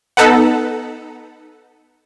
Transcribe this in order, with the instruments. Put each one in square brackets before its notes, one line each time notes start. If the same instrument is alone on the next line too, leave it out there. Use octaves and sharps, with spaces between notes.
[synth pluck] B3 D#4 A4 B4 F#5